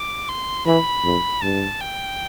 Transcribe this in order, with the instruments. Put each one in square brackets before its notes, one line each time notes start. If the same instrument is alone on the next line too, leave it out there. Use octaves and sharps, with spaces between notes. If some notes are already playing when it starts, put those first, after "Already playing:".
Already playing: [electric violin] D6
C6
[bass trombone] E3 [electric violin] B5
[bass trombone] F2
[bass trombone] G2 [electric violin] A5
[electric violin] G5